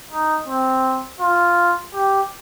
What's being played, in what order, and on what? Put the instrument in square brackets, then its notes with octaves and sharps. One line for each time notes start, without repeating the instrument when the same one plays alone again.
[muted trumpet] D#4
C4
F4
G4